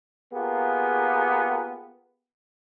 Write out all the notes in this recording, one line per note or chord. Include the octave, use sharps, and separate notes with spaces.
A#3 B3 F4 G4 G#4